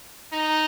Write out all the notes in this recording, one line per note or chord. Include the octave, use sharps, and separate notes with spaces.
D#4